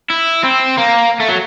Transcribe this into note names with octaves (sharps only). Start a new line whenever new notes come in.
E4
C4
A#3
A3
F#3